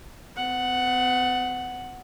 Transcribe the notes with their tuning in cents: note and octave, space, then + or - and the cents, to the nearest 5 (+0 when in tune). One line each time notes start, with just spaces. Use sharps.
B3 +45 F#5 +0